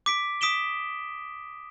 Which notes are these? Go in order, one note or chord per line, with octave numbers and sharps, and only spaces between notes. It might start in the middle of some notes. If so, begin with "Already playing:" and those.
D6 B6 D7
D#6 B6 D7 E7 G7